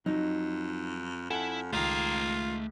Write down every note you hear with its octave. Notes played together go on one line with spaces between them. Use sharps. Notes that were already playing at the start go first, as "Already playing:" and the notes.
F2 F#3 D#4
F2 E4 A4 F#5 G#5
C#2 D#3 A3 F4 A#5